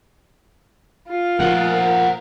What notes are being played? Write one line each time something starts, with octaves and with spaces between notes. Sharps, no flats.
F4
A#2 F3 A#4 C5 F#5